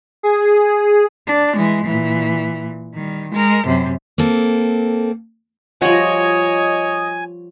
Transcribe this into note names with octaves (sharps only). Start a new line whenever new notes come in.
G#4
D4
E3 G#3
A#2 E3
D#3 G3
G#3 A#4
F#2 C3
A#3 C4 A4
F3 G3 F#4 C#5 D#5 G#5